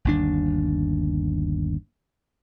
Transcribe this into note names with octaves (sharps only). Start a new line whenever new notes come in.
G1 D#2 D4